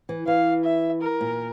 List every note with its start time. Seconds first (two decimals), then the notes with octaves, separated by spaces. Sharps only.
0.09 E3
0.27 E3 F5
0.64 E5
1.02 A#4
1.21 A#2